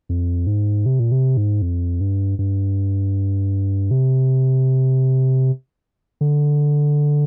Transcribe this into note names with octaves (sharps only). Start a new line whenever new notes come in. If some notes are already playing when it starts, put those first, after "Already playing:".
F2
G#2
C3
A#2
C3
G#2
F2
G2
G2
C3
D3